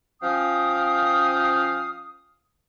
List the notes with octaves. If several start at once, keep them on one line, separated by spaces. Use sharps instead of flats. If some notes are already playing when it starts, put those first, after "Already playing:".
F3 C#4 F5 G5 D#6